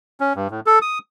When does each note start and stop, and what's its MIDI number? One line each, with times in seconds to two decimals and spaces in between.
0.20 0.33 61
0.36 0.48 43
0.51 0.60 45
0.66 0.79 69
0.82 0.99 87